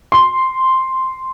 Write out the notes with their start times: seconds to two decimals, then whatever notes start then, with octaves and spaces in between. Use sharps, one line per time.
0.12 C6